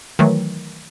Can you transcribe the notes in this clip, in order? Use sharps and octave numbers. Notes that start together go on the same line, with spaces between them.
D#3 E3 F#3 A3